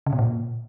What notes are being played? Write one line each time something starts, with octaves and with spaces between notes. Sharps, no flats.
C#3
B2
A#2